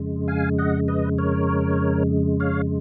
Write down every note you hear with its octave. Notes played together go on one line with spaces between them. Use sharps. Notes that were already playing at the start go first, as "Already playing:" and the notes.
Already playing: F2 C#3 G#3
F5 G#5
D#5 F#5
B4 D#5
A#4 C#5
C#5 F5